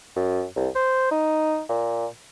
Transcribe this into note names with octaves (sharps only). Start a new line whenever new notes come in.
F#2
C2
C5
D#4
A#2